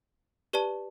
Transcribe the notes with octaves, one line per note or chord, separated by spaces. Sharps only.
G4 B4 D5 A5